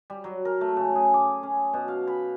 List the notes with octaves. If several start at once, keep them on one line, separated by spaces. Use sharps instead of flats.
G3
F#3
A#4
A3
C#3
G#4
D6
C#4
B2
F5
B5